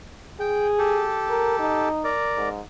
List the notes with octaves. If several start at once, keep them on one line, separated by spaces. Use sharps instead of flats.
G#4 G5
G4 A4
A#4
D#4
A#4 D5
G#2